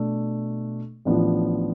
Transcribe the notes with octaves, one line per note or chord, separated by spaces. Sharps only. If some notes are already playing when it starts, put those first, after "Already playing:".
Already playing: B2 A3 D4
A1 A2 F3 B3 D4